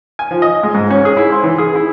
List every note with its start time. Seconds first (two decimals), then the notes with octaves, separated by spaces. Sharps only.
0.19 G#5
0.31 F3
0.42 D#5
0.63 G#3
0.74 G#2
0.90 C#4
1.05 G#4
1.17 E4
1.32 C5
1.44 E3
1.58 G#4
1.75 E4